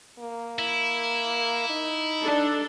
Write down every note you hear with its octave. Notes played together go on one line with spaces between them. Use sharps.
A#3
E4
D#4
D4 A4